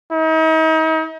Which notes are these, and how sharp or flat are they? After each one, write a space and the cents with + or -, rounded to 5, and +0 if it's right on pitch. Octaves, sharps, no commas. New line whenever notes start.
D#4 +40